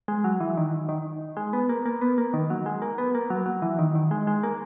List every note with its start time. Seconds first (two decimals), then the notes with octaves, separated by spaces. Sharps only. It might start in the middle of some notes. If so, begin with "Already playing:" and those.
0.08 G#3
0.24 F#3
0.40 E3
0.57 D#3
0.89 D#3
1.37 G#3
1.53 B3
1.69 A#3
1.86 A#3
2.02 B3
2.18 A#3
2.34 D#3
2.50 F#3
2.66 G#3
2.82 A#3
2.98 B3
3.15 A#3
3.30 F#3
3.46 F#3
3.62 E3
3.79 D#3
3.95 D#3
4.11 G#3
4.27 G#3
4.43 A#3